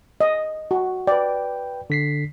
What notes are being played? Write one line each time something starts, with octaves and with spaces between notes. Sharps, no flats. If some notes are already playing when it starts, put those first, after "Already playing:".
D#5
F#4
B4 D5 G5
D3 B6 C7